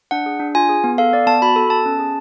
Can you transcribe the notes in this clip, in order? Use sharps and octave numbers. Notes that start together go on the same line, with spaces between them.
D4 F#5
G#4
D4
F4 G#5
G#4
B3
A4 F5
B3 D5
B3 A5
F#4 B5
A4
B3 A5
C#4
G#4